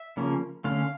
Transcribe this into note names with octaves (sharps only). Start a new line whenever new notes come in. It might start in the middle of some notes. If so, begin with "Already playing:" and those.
Already playing: E5
C#3 F3 A#3 C#4
D3 A3 C#4 F5